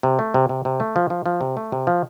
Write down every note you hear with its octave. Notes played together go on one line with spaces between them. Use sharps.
C3
A3
C3
C3
C3
A3
F3
F3
F3
C3
A3
C3
F3